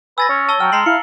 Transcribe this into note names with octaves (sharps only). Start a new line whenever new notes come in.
B4 G#5 E6 A6 A#6
C#4 C#5
A5 E6 G7
F#3 G5 F6
G#3 A#5 C7 F#7
E4 F5 C#7